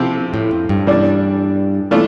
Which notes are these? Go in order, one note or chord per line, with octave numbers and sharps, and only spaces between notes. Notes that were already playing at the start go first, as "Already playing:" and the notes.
Already playing: C3 F3 C4 E4 G4
A2
F2
G2
E3 G3 D4
E3 A3 D4 F4